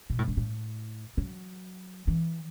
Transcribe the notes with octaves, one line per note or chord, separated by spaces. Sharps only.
B2
A2
G2
A2
F#3
E3